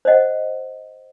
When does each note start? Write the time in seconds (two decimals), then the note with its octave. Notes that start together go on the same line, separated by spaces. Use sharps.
0.05 C5 D#5 F#5